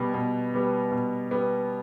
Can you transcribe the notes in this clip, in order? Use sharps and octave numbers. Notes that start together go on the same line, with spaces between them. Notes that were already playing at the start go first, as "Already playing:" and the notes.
Already playing: B2 G3 B3
B2
G3 B3
B2
G3 B3